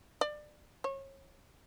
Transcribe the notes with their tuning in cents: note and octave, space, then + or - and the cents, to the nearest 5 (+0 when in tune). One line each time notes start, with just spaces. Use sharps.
D5 +25
C#5 -30